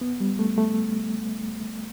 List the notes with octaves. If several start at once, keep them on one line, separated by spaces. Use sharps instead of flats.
B3
G3
A3
A3